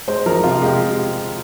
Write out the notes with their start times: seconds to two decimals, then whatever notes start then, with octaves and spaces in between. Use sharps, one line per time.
0.08 G#3 C5
0.26 F3 A#4
0.44 C3 F4
0.62 G#3 G4